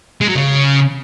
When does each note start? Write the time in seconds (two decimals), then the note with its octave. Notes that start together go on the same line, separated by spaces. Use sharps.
0.21 G#3
0.28 F#3
0.35 C#3